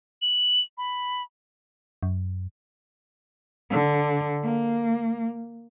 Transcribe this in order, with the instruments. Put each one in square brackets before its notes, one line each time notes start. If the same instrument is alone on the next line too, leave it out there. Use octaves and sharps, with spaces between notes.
[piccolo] F#7
B5
[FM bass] F#2
[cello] D3
A#3